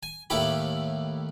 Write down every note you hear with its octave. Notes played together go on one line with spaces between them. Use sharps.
G#5
D#2 A2 E4 G4 B5